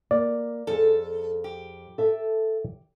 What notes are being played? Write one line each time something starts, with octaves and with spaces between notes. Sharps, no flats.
A#3 D5
F2 G#4 A4
G4
A4 E5